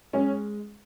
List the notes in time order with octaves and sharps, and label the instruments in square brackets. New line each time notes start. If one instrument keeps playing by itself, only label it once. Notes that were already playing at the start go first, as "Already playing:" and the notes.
[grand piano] G#3 [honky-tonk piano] C#4